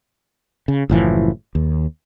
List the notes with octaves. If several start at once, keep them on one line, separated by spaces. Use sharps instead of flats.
C#3
F#1 A2 E3 F3
D#2